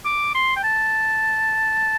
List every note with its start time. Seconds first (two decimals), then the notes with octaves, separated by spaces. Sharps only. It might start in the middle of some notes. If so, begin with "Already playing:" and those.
0.05 D6
0.35 C6
0.56 G5
0.64 A5